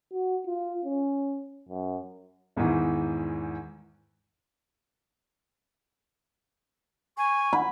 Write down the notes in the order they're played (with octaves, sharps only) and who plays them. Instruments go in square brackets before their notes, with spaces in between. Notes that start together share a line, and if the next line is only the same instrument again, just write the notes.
[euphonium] F#4
F4
C#4
F#2
[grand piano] E2 G#2 D#3 E3
[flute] G#5 [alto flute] C#6
[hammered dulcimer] B5